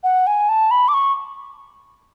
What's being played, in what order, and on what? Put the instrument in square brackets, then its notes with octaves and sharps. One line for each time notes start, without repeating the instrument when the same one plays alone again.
[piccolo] F#5
G#5
A5
B5
D6
C#6